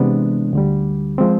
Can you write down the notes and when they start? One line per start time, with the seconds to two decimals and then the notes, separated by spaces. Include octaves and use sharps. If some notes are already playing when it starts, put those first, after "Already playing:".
Already playing: C3 E3 G#3 B3 D4
0.53 D2 D3 G3
1.18 F3 G#3 C4